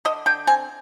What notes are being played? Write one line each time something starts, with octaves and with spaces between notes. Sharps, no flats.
D3 D#5
D3 G5
C4 G#5